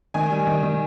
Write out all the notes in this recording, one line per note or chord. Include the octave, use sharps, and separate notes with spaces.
D#3 G#5
G3
D#3
D#3